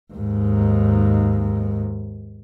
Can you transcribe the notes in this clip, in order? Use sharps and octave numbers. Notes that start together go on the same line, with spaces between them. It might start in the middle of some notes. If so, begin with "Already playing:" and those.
D#2 G#2